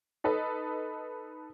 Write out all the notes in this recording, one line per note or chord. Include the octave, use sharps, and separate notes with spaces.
D#4 A4 B4 D#5